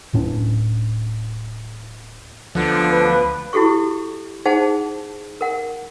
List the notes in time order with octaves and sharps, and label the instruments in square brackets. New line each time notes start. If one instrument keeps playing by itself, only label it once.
[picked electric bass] D1 A2 C#4 D4
[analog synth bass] D2 [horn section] D3 B3 D4 [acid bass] F3
[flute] B4
[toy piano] E4 F#4 G4 A4 C#6
D#4 G#4 C5 F#5 A5
A#4 F#5